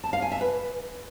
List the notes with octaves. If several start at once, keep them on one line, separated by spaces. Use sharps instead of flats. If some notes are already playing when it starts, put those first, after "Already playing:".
A5
F5
G#5
E5
B4